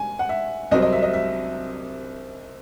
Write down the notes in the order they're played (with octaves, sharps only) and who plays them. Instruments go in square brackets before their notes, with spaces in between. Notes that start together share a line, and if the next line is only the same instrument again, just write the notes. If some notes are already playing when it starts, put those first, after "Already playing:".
Already playing: [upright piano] G#5
F#5
E5
C2 C3 F#3 C4 D#5
D#5
E5
D#5
E5